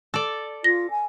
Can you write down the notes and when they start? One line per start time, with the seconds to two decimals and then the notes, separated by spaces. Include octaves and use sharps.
0.14 A4 D5
0.64 F4 A#6
0.90 G#5